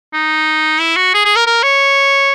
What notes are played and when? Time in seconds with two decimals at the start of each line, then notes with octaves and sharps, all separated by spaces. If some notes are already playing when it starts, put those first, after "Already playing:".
0.14 D#4
0.80 E4
0.96 F#4
1.14 G#4
1.25 G#4
1.36 A#4
1.47 A#4
1.63 C#5